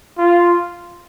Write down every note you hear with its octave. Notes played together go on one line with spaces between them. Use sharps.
F4